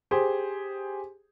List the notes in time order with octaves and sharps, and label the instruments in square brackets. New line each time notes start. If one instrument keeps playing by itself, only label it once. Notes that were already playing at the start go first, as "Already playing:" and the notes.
[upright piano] G4 G#4 C5